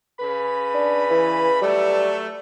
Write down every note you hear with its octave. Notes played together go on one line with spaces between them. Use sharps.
C#3 B4 B5
D4
E3
F#3 G3 A3